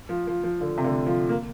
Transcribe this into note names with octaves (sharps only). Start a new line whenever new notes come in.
F3
F3
F3
D3
C3
D3
F3
A#3